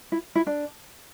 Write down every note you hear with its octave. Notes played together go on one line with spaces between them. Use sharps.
E4
E4
D4